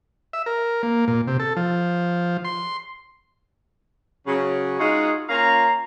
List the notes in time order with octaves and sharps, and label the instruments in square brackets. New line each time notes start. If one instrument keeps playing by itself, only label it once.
[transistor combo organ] E5
A#4
A#3
A#2
C3
A4
F3
C6
[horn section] C#3 F#3 C#4
G#3 D#4 F4 F#4 G#4
A#3 C#4 F4 F5 A#5